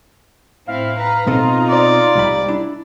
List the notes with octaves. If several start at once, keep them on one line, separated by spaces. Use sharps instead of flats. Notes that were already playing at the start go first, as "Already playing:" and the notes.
A2 C4 E4 F5
B4 A#5
B2 C4 D#4 F4 A4 A#5
D5
C2 G3 B5
D4 E4